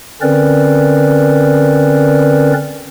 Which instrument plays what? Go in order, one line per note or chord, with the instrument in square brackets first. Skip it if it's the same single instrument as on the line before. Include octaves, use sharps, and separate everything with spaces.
[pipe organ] D3 C4 C#4 A#4 B4 D5